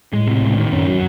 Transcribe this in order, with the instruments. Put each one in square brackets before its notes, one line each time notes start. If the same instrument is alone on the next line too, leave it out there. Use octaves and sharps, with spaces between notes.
[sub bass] A2 [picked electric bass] G#3
[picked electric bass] C3
C#2
D#3
[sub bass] F#2 [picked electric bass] C#4
[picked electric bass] F#3